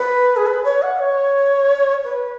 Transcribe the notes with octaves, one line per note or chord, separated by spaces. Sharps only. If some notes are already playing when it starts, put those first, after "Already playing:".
Already playing: B4
G#4
B4
C#5
F#5
C#5
B4